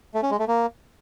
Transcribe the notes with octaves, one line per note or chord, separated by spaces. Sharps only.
A3
C#4
G#3
A3
A#3